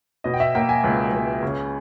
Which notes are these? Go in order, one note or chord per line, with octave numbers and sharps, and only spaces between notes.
B2 D#5
G5
E5
A#3 G5
G#5
C#2
C#2
C#3